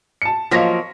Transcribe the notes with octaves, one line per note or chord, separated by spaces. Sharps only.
A5 C#7
F3 F#3 A#3 D#5 A#6 B6